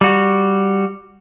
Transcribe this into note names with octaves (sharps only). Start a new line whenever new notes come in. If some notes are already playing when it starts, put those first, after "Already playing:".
G3 F#4